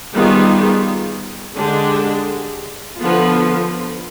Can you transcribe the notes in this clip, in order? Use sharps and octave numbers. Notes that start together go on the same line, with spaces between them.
D#3 G3 B3 F4 G#4
D3 G#3 D4 G4
D3 F3 B3 F4